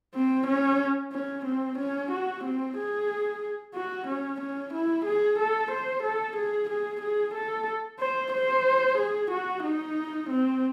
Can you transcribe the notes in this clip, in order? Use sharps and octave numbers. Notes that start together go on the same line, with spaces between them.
C4
C#4
C#4
C4
C#4
F#4
C4
G#4
F#4
C#4
C#4
E4
G#4
A4
C5
A4
G#4
G#4
G#4
A4
C5
C5
G#4
F#4
D#4
C4